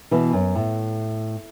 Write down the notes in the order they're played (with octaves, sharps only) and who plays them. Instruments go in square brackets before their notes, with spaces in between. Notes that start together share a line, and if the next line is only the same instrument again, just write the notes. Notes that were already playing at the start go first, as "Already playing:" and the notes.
[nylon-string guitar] B2 E3
F#2
A2